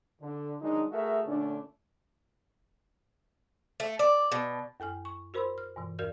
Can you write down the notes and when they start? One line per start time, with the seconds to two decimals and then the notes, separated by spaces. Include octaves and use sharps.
0.21 D3
0.61 D#3 F#3 G#3 D4 D#4
0.91 A3 F#4 G#4 A#4 E5
1.27 A#2 D3 A3 C#4 D4
3.80 A3
3.99 D5
4.32 B2
4.80 F#2 A4 G#5 F6
5.05 C#6
5.34 F#4 A#4 C5 B5 C6 E6
5.58 F6
5.76 G2 B2 E3
5.99 E2 F#4 A#4 D5 F6 G6